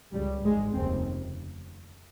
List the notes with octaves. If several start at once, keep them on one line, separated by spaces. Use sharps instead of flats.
C#2 C#3 G3
G#1 G#2 G#3
F1 D#2 C#3 C4